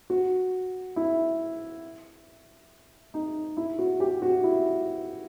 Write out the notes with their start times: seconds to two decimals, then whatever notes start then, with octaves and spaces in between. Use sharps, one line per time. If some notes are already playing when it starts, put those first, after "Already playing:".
0.10 F#4
0.96 E4
3.14 D#4
3.57 E4
3.79 F#4
4.00 G4
4.22 F#4
4.44 E4